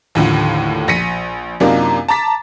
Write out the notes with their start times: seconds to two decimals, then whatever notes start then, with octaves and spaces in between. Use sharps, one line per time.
0.15 D#2 A2 D3 F3
0.88 A#1 A#6 B6 C#7 D#7
1.60 F#2 C3 A#3 D4 D#4 F4
2.09 A5 A#5 D6 A6 B6